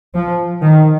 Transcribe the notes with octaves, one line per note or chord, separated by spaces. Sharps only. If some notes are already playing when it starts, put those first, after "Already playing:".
F3
D#3